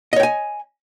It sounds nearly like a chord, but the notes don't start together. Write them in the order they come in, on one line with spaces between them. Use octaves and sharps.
D#5 C#5 G5 G#5